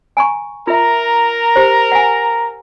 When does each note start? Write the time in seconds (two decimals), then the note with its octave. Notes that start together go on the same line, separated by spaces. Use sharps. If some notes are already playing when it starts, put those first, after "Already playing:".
0.17 G#5 A#5 C#6
0.67 F4 A#4 E5 A#5
1.56 G4 C5
1.92 F#5 G#5